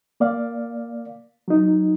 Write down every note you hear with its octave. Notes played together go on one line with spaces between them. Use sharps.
A#3 D5 F5
F#3 D#4